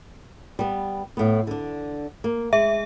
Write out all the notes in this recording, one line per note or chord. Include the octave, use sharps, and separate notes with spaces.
G3 B3
A2 B3
D3 D4
A#3
G#3 E5